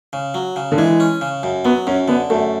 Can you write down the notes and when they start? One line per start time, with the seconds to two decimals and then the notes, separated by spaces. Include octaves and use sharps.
0.13 C#3
0.34 F#3
0.56 C#3
0.72 D3
0.78 E3 G#3
1.00 C#4
1.21 C#3
1.43 F#2
1.65 F#3 B3
1.87 F#2 C#4
2.08 D3 B3
2.30 F#2 A3